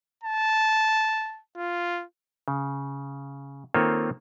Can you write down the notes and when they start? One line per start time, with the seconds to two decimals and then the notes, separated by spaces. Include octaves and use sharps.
0.24 A5
1.58 F4
2.48 C#3
3.74 D#3 A#3 C4 F4 A4 C#5